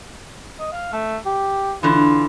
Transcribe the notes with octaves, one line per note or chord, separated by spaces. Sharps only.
D#5
F5
A3
G4
D3 E3 F4